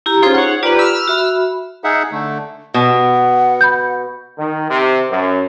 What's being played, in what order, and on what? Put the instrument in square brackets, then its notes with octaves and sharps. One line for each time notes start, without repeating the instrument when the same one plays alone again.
[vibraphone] E4 G4 A#5
[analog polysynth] C#4 F4 [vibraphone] D#4 G#4 C5
[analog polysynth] C#5 F#5
[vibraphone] F4 D5 A#5 [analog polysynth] G4 B4
[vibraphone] B5 [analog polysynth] E6 F6
[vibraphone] F#4 E5 B5
[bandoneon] D#4 G#4 E5 F#5
D3 A3
[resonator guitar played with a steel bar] B2 [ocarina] F#5
[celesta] B5 G6
[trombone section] D#3
C3
F#2